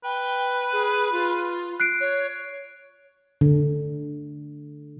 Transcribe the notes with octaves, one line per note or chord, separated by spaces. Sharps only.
B4 G5
G#4
F4
F#6 C7 D7
C#5
D3